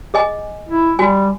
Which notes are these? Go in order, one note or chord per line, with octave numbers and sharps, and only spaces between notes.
G#4 D#5 G#5
E4
G3 F#4 G#5